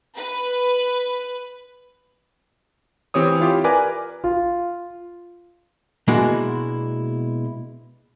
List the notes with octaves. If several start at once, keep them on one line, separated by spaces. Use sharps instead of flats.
B4
E3 C4 G4 C#5 D#6
E4 F4 G4
A#4 B4 D5 G#5 D6
F4
B2 G#3 A#3 D4 E4 F#4